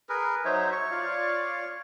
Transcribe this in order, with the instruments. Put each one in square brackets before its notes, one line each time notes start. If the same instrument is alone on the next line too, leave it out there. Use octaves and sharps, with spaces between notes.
[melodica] G#4 A#4 B4
[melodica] F#3 D#4 C#5 [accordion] C5 E5
[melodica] C#5 C#6
[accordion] F4 D5 F5